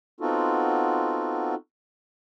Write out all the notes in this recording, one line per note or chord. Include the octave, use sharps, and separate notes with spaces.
B3 C4 D#4 F4 F#4 A4